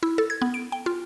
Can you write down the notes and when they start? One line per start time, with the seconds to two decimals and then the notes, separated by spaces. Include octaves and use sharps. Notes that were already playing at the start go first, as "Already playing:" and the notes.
0.03 E4
0.18 A4
0.30 G#6
0.42 B3
0.54 D7
0.72 G5
0.86 F4